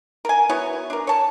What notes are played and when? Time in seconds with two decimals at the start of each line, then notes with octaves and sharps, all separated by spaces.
0.25 A#4 G#5
0.49 B3 E4 F#4 C#5
0.90 D4 A#4
1.07 C#5 A5